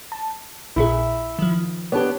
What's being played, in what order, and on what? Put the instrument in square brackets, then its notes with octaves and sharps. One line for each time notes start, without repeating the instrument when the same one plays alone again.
[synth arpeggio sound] A5
[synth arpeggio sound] A#1 A#2 G#4 [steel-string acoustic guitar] E4
[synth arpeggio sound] D#3 F3
[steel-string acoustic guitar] B3 D4 [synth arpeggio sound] G4 C#5